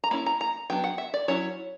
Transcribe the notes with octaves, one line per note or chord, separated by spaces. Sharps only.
A#5
A#3 C#4 E4 B5
A#5
A#5
F#3 B3 D4 G5
F#5
E5
D5
F#3 C#4 E4 C#5